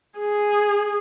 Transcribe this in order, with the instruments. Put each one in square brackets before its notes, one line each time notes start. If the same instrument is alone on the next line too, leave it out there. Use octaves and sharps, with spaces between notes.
[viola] G#4